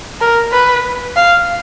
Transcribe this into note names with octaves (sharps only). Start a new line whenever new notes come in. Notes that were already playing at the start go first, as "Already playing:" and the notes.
A#4
B4
F5